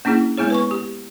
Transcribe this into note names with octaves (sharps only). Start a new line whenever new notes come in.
A#3 C#4 D4 E4 G#4
G#3 B3 E4 G#4 C#5
B4 G#5 C#6
G4